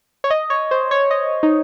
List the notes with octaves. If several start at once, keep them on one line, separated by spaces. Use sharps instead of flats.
C#5
D#5
C#5
C5
C#5
D#5
D#4